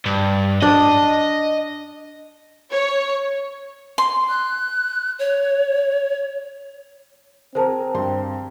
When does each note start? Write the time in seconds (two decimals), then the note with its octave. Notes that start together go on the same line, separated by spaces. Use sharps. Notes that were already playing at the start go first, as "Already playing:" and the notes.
0.06 G2
0.62 D4 D#5
2.71 C#5
3.98 C6
4.29 F#6
5.19 C#5
7.55 C4 G#4 A#4 C5 A5 A#5
7.94 G2 G5 C6